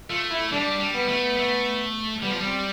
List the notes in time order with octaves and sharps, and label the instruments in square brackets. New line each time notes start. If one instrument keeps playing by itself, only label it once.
[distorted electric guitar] A3 [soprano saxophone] F4
[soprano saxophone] E4
[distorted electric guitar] G3 [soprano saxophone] D4
[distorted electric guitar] G3
[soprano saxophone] B3
[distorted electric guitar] A3
A3
[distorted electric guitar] G3 [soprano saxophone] B3
[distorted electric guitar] F3
G3
[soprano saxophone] C4